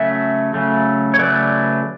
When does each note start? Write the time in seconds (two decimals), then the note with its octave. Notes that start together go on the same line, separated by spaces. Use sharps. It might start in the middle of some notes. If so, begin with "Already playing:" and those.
Already playing: C#3 F#3 A3 E5
0.54 C#3 F#3 A3
1.14 C#5
1.19 C#3 F#3 A3 B4 D5